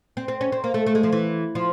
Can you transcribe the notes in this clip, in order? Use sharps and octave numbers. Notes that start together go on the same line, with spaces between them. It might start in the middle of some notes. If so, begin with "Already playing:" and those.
C4
C4
C#4
C4
A#3
A3
A3
G#3
F3
E3
F3